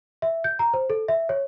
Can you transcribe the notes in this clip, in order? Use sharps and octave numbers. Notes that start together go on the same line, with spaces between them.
E5
G6
A#5
C5
A4
E5
C#5